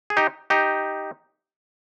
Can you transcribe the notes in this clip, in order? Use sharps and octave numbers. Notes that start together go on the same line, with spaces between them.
G#4
D#4 G4
D#4 G4